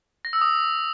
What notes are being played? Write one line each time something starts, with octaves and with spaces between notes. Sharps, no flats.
A#6
E6
D#6